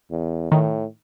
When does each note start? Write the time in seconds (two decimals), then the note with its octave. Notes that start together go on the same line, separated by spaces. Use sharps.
0.11 E2
0.52 A2 D#3